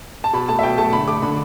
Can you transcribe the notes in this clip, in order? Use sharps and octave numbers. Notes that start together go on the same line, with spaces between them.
A5
B2 B5
A3 A5
E5
B2 G5
A3 A5
D3 B5
A3 D6
D3 B5